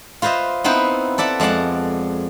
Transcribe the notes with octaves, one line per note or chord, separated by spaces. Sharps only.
F4 B4 C5 D#5 E5
B3 C4 D#4 E4 B4 C5
A4 D5 E5 F#5
F2 G#3 D5 F#5 A5